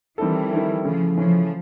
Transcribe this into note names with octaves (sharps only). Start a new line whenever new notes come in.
D#3 E3 G3 C4 E4 A4
D#3 G3 C4 E4 A4
C#3 E3 F3 A3 C#4
C#3 E3 F3 A3 C#4